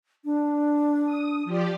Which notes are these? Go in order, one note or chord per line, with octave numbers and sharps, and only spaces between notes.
D4
D#6
F3 G4 D5